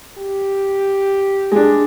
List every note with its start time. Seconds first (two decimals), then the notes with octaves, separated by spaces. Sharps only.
0.18 G4
1.52 G#3 D4